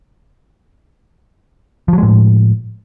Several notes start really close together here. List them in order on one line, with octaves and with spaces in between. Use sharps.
F3 F#3 G#3 A2